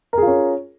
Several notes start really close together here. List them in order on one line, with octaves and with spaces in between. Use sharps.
A#4 G#4 F4 C#4